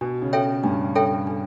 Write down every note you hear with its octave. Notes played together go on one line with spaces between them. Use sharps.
B2 D4
C#3
A4 C#5 E5 G5
G2 D4
A4 C#5 E5 G5
D4